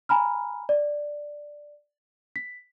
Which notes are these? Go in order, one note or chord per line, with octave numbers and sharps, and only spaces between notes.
G#5 A#5 B5 F6
D5
B6